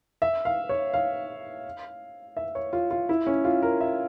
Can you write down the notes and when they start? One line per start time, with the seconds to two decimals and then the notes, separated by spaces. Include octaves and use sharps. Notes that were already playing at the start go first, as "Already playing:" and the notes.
0.22 E5
0.45 F5
0.69 C#5
0.94 F5
2.37 E5
2.55 C#5
2.73 F4
2.91 F4
3.09 E4
3.27 C#4
3.45 F4
3.62 A#4
3.81 E5